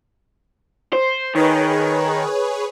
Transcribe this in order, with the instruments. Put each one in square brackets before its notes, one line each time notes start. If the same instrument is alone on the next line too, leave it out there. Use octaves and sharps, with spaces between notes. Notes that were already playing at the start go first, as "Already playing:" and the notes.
[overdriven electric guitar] C5
[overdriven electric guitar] D#3 [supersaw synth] G#4 B4 C#5